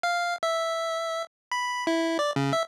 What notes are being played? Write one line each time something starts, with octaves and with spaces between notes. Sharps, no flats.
F5
E5
B5
E4
D5
C#3
E5